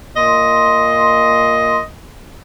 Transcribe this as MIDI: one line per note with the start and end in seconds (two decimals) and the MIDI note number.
0.16 1.80 46
0.16 1.80 75
0.16 1.80 84